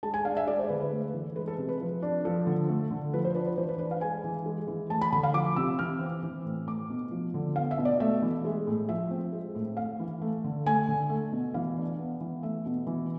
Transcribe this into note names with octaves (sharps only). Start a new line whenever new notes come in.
G#3 A5
G#5
D4 F5
E5
G#3 D5
C5
D3 B4
B4
A3
E3
G#3 B4
A4
C3
B4
F3
D4
F3 A4
D3
A3
D3
F3 B4
C5
D4 B4
B4
E3 C5
B4
D4 B4
F5
G#3 G#5
E3
G#3
E3
A3 A5
B5
D3 B5
F5
F3 D6
C3 E6
E3 F6
C4
E3
A2
A3 D6
B2
F3
D3
B3 F5
E5
B2
D5
A3 E5
E3
G#3
A2
F3 E5
C4
G#3
A2
A3 F5
E3
A3
D3
A3 G#5
D3
A3
B2
E3 F5
D4
B3
E3
A3 E5
B2
E3